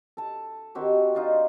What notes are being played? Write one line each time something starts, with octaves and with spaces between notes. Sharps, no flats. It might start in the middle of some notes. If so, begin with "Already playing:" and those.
A4 A5
D#3 C4 F#4 G4
D#4 F4 C5 D5